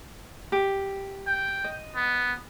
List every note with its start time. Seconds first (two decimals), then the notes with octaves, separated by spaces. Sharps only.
0.52 G4
1.27 G5
1.64 D#5
1.96 B3